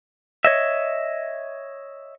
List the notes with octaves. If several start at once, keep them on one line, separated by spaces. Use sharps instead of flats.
C#5 D#5 E5